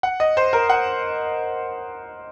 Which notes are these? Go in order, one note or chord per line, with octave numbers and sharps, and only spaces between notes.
F#5
D#5
C5
A#4
F#5